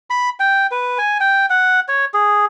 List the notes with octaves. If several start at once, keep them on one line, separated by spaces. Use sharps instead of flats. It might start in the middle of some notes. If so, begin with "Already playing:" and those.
B5
G5
B4
G#5
G5
F#5
C#5
G#4